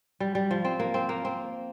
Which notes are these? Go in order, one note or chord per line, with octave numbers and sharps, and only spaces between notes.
G3
G3
F3
C4
A#3
C4
A#3
C4